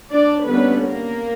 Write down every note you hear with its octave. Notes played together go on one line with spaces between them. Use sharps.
D4 D5
D3 G3 A#3 B3 C#4 B4
A#3 A#4